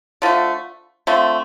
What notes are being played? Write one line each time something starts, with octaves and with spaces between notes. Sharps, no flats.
D3 F3 A3
D3 F3 A3 C4